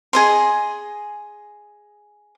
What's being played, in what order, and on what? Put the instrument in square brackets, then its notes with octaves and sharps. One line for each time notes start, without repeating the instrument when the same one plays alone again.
[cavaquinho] G#4 D#5 C6